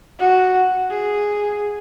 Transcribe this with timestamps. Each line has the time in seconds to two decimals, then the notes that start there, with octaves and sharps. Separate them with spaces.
0.19 F#4
0.91 G#4